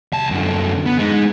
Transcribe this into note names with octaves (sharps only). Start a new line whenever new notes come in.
C2 A5
F#2 D3
B3
G#3 D#4